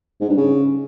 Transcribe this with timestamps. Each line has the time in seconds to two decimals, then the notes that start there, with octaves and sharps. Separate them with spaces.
0.21 G#2
0.29 G2
0.37 C#3